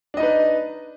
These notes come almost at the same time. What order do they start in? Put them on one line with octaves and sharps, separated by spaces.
D4 D#5 D#4 B4